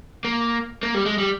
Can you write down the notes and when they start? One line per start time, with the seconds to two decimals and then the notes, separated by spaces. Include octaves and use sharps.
0.25 A#3
0.83 A#3
0.94 G3
1.06 G#3
1.18 G3